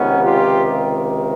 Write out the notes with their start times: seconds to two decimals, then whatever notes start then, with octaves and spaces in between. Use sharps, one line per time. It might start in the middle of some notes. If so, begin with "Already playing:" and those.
Already playing: C#2 C3 D#3 B3 C#4
0.23 F4 G4